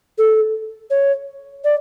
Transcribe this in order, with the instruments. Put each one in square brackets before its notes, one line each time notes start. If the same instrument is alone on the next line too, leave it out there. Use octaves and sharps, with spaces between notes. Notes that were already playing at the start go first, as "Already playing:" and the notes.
[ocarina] A4
C#5
D5